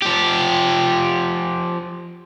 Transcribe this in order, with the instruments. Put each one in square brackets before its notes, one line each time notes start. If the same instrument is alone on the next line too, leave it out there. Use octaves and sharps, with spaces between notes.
[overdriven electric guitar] F3 G4